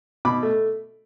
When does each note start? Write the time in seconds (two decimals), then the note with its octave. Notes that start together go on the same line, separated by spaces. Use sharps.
0.25 B2 B5 D6
0.43 A3